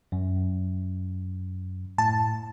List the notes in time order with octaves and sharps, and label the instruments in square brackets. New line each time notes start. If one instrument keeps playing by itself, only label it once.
[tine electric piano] F#2
[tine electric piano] A2 [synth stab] A5